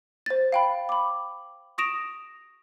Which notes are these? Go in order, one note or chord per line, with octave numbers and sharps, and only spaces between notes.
C5 A6
F5 G5 B5
B5 D6
C#6 D#6 A#6 D7 E7 F7